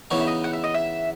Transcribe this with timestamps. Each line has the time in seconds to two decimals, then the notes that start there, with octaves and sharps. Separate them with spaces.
0.11 C#3 E3 B3 D#4 C#5
0.20 E5
0.27 D#5
0.44 F#5
0.53 E5
0.64 D#5
0.74 E5